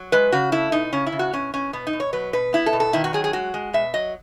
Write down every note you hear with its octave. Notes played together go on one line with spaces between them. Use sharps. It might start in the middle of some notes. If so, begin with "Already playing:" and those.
Already playing: F#3
G#3 B4
C#3 F#4
A3 E4
B2 D#4
C#3 C#4
E4
C#3
F#4
B2 C#4
B2 C#4
B2 B3
D#4
B2
C#5
F#3 B4
B2 B4
B3 E4
A4
B2
A4
D#3 E4
F#4
F#3 G#4
G#4
G#3 F#4
G#3
B2 E5
F#3 D#5